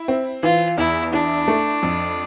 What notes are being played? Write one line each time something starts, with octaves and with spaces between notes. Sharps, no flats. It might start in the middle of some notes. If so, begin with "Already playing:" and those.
Already playing: E4
C4
E3 F4
E2 E4
D4 E4
A3
F2